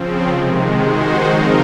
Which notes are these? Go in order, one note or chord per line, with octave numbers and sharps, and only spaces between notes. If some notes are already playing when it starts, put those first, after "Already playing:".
Already playing: C#3 F3 C4
C3 D#3 G#3
D#3 G#3 D#4 F#4 C5
C#3 F3 C4 D#4 A#4